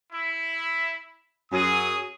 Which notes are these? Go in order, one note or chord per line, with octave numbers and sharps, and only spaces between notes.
E4
F#2 F#3 G#4 D#6